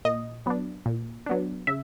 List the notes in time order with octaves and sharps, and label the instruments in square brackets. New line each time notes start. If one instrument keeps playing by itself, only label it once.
[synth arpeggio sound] A#2 D#5
F#3 B3 D4
A#2
F#3 B3 D4
C#3 E5